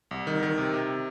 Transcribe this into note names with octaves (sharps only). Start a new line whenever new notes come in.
C2
D#3
D#3
C3
C3